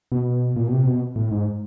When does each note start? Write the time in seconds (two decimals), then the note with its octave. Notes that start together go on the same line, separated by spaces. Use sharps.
0.12 B2
0.56 A#2
0.68 B2
0.72 C3
0.87 B2
1.16 A2
1.31 G#2